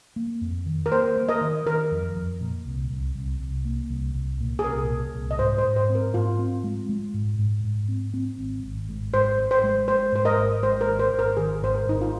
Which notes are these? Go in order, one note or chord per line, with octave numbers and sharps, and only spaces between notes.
A#3
F2
D#3
A#4
A#3 C5
A#3
A#4 D#5
D#3
D#3 A#4
F2
F2
A#2
C2
C2
C2
C2
A#3
C2
C2
A#2
G#4
C2 A#4
A#2
C2
D#5
G#2 C5
C5
G#2
C5
C4
A#4
G#2 F4
C4
G#3
G#3
G#2
G#2
G#2
C4
C4
G#1
G#1
G#2
G#2 C5
G#1
C5
G#3
G#3 C5
G#2 C5
A#4 D#5
G#1
G#3 C5
A#4
G#1
C5
G#1
A#4
D#3 G#4
G#1 C5
A#4
G#1 D#4
F4